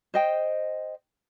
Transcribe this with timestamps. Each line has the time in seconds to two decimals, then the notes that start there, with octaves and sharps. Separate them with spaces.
0.14 C5 D#5 G5